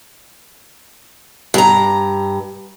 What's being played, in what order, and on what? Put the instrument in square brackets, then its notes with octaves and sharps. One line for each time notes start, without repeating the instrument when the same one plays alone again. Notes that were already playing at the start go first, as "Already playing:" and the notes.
[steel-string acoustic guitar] G2 A#5